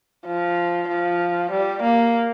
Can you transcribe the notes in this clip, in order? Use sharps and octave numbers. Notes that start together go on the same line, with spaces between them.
F3
F3
G3
A#3